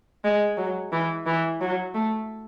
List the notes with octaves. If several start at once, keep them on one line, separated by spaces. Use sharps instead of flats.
G#3
F#3
E3
E3
F#3
A3